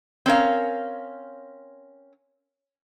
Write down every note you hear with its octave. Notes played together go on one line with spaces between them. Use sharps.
C4 C#4 A#4 F5